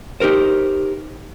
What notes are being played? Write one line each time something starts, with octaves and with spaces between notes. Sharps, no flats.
D#4 G4 A4 A#4 C5